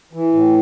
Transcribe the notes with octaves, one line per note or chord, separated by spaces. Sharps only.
E3
A2